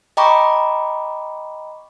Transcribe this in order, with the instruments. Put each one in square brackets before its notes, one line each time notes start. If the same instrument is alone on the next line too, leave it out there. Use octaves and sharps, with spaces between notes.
[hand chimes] D#5 G5 A#5 B5 C#6 D6